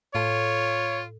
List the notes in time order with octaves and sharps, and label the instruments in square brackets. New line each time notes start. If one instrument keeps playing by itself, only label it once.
[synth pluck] A2 A4 [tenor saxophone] F4 [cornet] C#5